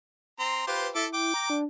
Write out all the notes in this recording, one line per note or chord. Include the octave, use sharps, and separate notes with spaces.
C4 A#5 C6
F4 G4 B4 C5
E4 A4 E5 D6
G5 D6
A#5
D4